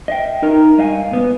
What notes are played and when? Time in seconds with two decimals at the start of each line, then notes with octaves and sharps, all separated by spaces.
0.08 D#5 E5 G5
0.42 D#4 A#4 A#5
0.78 G2 D#5 F5 G#5
1.11 A#2 B3